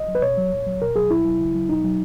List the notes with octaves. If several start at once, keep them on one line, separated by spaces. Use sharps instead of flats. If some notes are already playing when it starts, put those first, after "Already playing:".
Already playing: D#5
F#3
B4
B2 C#5
F#3
A#2
F#3
B2 A#4
F#3 G#4
B2 E4
F#3
C#3
F#3
B2 D#4
F#3